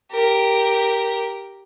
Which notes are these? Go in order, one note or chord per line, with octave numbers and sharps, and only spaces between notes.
G4 A#4